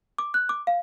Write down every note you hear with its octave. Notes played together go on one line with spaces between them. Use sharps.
D6
F#6
D6
F5